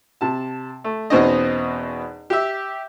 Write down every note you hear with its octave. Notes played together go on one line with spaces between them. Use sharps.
C3 A5
A3
E2 B2 C4 C#4 D#4 D#5
G4 E5